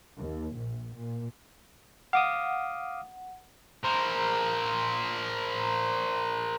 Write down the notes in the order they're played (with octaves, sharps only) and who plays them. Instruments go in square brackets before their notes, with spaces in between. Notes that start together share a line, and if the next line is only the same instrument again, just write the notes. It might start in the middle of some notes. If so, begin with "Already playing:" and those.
[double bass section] D#2
A#1
A#2
[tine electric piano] F5 D6 D#6 [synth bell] F#5
[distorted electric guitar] A#4 C5